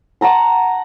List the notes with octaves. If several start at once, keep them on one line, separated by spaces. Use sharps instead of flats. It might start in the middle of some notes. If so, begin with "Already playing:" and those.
F#5 A5 A#5 C6